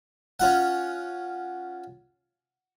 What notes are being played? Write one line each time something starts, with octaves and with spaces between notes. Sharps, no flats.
C#4 F4 F#5